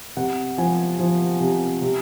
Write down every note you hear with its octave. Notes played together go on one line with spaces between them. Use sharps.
C3 F#5
F3 G#5
F3
C3
C3